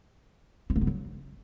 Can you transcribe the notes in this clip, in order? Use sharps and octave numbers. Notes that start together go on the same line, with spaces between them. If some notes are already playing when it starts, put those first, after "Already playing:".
C4
A#3
B3
F#3